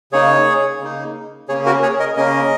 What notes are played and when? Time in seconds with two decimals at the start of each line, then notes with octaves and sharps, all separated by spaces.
0.12 C#3 A#3 D#4 G#4 C#5
0.80 C#3 A#3 D#4
1.48 C#3 A#3 C#4 G#4 C#5
1.66 F#4 A#4
1.82 G#4 C#5
1.99 A#4 D#5
2.16 C#3 A#3 C#4 A#4 D#5